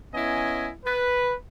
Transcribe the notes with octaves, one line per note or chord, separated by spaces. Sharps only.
B3 C#4 E4 D#5 G#5
B4